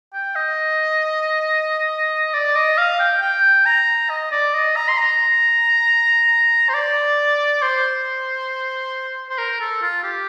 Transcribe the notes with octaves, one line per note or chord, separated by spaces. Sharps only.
G5
D#5
D5
D#5
F5
G5
G5
A#5
D#5
D5
D#5
A#5
C6
A#5
C5
D5
C5
C5
A#4
A4
F4
G4